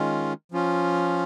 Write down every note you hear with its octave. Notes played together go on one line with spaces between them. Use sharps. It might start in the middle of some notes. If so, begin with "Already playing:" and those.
Already playing: D#3 G#3 C#4 F4
F3 C#4 F4